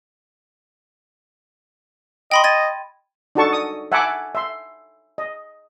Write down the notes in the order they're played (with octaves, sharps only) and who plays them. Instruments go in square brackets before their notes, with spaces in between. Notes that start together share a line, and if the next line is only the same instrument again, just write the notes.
[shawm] D#5 [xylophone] G5 B5 C6
[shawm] D#5 [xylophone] G#6 A6 D#7
[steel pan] D4 D#4 F#4 A4 A5 C#6
D#6
E5 F#5 G#5 A5 B5 D6
E5 C6
D#5